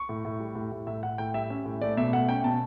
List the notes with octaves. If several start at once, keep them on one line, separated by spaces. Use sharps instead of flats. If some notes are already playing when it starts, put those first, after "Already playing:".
Already playing: C#6
A2
A2
G3
A2
A2
A2 E5
A2 F#5
A2 G5
G3 E5
C#4
A2
A3 D5
B2 E5
A3 F#5
C#4 G5
B2 A5